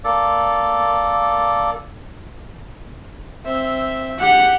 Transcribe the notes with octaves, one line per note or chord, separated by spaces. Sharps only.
A#3 A4 D5
C4 E5
G4 F#5